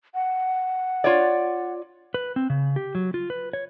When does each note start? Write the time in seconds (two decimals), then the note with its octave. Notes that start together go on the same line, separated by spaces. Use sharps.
0.14 F#5
1.04 F4 C#5 D5
2.14 B4
2.36 C4
2.50 C#3
2.76 G4
2.95 F#3
3.14 F4
3.30 B4
3.53 C#5